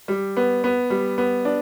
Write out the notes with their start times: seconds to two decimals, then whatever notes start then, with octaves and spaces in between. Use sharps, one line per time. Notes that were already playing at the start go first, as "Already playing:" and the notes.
0.08 G3
0.37 B3
0.64 B3
0.90 G3
1.18 B3
1.45 D4